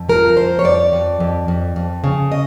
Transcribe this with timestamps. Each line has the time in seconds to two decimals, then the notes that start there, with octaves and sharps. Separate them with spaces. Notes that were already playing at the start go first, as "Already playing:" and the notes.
Already playing: F2
0.09 F3 A#4
0.37 F2 C5
0.59 C#5
0.64 F2 D5
0.93 F2
1.20 F2
1.48 F2
1.76 F2
2.04 C#3
2.32 D#5